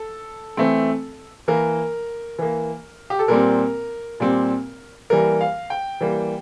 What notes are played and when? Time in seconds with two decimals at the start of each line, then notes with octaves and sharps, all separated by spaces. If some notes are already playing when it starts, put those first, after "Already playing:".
Already playing: A4
0.57 E3 A3 C4
1.48 E3 A#3 A#4
2.39 E3 A#3
3.10 G4
3.19 A4
3.28 A#2 G3 C4 A#4
4.20 A#2 G3 C4
5.10 E3 G3 A#3 A#4
5.41 F5
5.70 G5
6.01 E3 G3 A#3